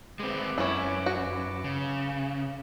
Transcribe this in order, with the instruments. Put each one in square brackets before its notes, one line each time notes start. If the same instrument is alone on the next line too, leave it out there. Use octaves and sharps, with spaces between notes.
[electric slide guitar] G#3 C4 [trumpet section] B4 D6
[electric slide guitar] F#2 [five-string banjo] C#4 E4
[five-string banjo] F#4
[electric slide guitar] C#3